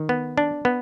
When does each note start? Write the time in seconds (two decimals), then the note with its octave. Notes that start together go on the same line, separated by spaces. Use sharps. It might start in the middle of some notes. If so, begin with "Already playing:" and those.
Already playing: D#3
0.09 B3
0.38 D4
0.65 B3